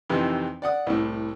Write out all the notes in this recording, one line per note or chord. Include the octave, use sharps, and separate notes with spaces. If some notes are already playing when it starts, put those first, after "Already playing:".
F2 C3 D#3 E3 D#4
D5 F#5 D#6
C2 A2